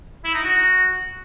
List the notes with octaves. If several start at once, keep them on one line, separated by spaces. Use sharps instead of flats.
E4
D#4
F#4